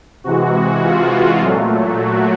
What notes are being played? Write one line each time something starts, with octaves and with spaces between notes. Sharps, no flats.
C3 E3 G#3 F#4
F4
F4
A#2 F#3 A3
F#4